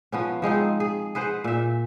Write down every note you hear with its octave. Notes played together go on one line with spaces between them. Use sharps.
F3 B3 C#4
F3 G#3 C4 D#4
G#4
G#4 B4 C5 F#5
A#2 E5